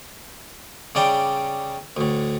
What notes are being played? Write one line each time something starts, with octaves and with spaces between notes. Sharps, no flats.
C#3 G3 D5 G5
D2 A2